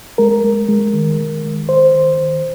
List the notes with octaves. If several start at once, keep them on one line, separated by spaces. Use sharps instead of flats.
G#3 A#4
G#3
G#3
D#3
D#3
D#3
D#3 C5
D#3
D#3